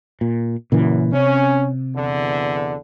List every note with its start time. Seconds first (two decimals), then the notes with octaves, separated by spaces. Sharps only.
0.21 A#2
0.72 F#2 A#2 C#3 E3
1.13 C3 C#4
1.96 E2 D3